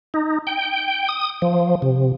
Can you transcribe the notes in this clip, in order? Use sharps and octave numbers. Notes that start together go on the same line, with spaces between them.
D#4
G5
D#6
F3
C3